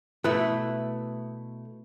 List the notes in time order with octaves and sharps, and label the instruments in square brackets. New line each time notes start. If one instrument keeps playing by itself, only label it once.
[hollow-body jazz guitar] B2 A3 [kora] E4 B4